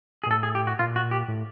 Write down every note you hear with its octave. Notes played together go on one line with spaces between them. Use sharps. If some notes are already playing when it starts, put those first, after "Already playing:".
G#4
A#2
A2 A4
G#4
G4
F#4
A#2 F4
F#4
G4
A2